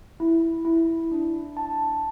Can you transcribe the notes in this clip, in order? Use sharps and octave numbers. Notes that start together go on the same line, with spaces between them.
E4
E4
D4
A5